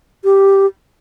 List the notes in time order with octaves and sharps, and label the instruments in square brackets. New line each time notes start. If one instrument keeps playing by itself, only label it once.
[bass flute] G4